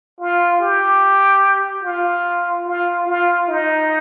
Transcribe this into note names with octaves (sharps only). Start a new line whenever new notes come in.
F4
G4
F4
F4
F4
D#4